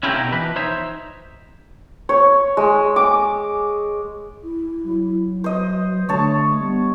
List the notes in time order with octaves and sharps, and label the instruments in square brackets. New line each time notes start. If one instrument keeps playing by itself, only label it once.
[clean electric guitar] C#4 E4 F4 G4 A4 A#4
B2 D#4 G4
E3 F3 B4
D#4 C5 C#5 E5
[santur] C#5
G#3
D6
[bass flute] E4
[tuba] F#3
[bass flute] B4 [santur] C5 D#5
[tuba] D3 [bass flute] A3 [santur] C#5 A5
[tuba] G3 [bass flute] B3